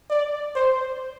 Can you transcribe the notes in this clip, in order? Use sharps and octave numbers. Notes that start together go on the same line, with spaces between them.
D5
C5